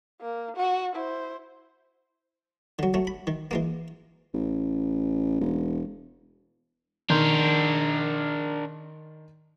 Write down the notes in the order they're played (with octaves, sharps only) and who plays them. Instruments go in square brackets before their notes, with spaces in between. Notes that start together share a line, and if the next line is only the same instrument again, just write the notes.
[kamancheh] A#3
F#4
E4 C5
[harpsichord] D3 F#3
F#3 A3
B5
D#3
E3 G#3 A#3
[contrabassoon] A1
E1
[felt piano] D#3 C6 G6 [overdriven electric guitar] D4 A#4